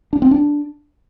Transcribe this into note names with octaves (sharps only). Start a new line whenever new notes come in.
D4
C4
D4